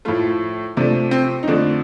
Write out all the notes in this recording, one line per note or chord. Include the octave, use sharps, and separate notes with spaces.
A2 F3 A3 F4
C3 F3 A3 D4
C4
D#4
F2 D3 A3 D4